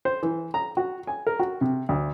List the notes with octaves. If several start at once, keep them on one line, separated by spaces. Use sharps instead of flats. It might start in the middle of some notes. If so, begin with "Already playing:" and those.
C5
E3
A#5
F#4
G#5
A#4
F#4
C3
D2